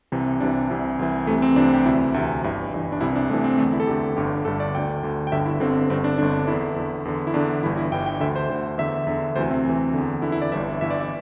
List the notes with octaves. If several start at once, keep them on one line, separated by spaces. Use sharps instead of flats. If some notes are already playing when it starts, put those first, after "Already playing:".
C2 C3 E3
C2 C3 E3 D4
C2 C3 E3
C2 C3 E3
C2 C3 E3 A3
C4
C2 C3 E3 D4
G4
D2 C3 E3 E4
D2 C3 E3
G1 G2 E3
G1 G2 E3
D4
C2 C3 E3 E4
D4
C2 C3 E3 A3
C4
E2 D3 A3
E4
A4
E2 D3 G4
G1 G2 D3 G4
G1 G2 D3 A4
D5
D2 D3 G5
D2 D3
G5
G1 G2 D3 E5
E4
G1 G2 D3 C4
G1 G2 D3 C4
D4
G1 G2 D3 D4
E2 D3 E4
E2 D3
E2 D3
E4
E2 D3 D4
G1 G2 E3 E4
E4
G1 G2 E3 G5
G5
D2 D3 E5
C5
D2 D3
E2 D3 E5
E2 D3 E5
D2 C3 E3 C5
C4
D2 C3 E3
E2 D3
E2 D3 E4
E4
D5
G1 G2 E3 E5
G1 G2 E3 E5
D5
E5